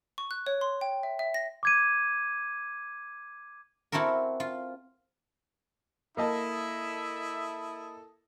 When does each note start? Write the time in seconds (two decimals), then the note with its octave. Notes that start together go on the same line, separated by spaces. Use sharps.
0.18 C#6
0.31 F#6
0.46 C#5
0.61 C6
0.81 G5
1.03 E5
1.19 E5
1.34 A#6
1.63 D6 G#6 D#7
3.92 C4 E4 F#4 A4 A#4
4.40 F4
6.17 A#3 E4 A4 D#5 E5 A5 D#6